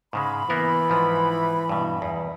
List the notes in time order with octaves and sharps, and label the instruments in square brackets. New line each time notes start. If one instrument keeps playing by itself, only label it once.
[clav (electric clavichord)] G#2 C#3 G#3 [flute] B5
[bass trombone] E3 [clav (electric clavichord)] A#3 B3 A#4
[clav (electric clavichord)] G#2 F3
G2 B2
E2